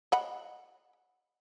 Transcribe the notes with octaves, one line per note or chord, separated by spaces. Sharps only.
D#5 F#5 B5